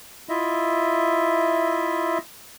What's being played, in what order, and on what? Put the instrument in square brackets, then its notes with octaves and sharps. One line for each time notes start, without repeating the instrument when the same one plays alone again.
[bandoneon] E4 F4 D#5 E5